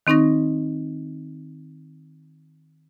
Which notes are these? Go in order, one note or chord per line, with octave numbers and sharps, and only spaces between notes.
D#3 C4 D#4 C#6 A#6